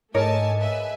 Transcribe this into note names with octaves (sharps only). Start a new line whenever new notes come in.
G#2 A3 G#4 A#4 C#5 D#5 G#5 A5
B4 E5 G#5